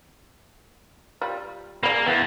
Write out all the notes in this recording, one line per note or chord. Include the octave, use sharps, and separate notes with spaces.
G3 F4
A#3 G#4 D5 B5
E2 B3